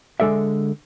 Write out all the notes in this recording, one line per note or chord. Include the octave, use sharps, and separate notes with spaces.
D3 G#3 A4 D5 E5